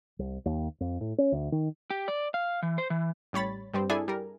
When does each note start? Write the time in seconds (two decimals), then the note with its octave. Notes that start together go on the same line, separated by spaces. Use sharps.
0.19 C2
0.46 D#2
0.81 F2
1.01 A2
1.18 C#4
1.32 D2
1.52 D#3
1.90 G4
2.08 D5
2.34 F5
2.62 E3
2.78 C5
2.90 E3
3.33 A1 G3 C#5 B5 A6
3.74 G2 G3 C4
3.90 D4 E4 G#4 A4 G#5
4.08 G3 A#4